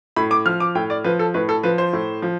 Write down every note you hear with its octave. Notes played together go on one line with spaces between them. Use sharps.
A2 B5
D6
F3 F6
D6
A2 G5
D5
F3 B4
A4
A2 B4
A4
F3 B4
C5
A2
F3